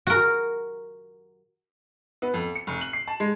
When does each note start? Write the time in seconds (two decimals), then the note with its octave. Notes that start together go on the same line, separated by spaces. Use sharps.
0.07 F#4 A#4
2.22 B3
2.34 F2
2.55 C#7
2.67 F1
2.81 F#7
2.93 C7
3.08 A5
3.20 G#3